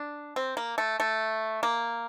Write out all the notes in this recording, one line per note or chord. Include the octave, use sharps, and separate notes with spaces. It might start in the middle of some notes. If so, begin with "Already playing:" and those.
Already playing: D4
C4
A#3
A3
A3
A#3